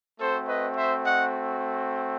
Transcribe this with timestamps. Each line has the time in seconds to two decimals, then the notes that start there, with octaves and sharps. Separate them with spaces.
0.19 A3 C4 F#4 A4 C5
0.48 B4 D#5
0.76 C5 E5
1.05 D#5 F#5